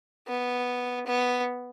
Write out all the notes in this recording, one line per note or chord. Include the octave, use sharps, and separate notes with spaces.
B3
B3